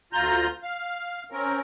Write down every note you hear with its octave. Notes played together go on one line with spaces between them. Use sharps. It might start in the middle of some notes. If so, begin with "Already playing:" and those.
D2 F4 A#5 G6
F5
C4 C#4 A#4